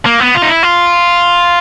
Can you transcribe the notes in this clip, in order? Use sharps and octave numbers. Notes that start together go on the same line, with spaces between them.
A#3
B3
F4
D#4
E4
F4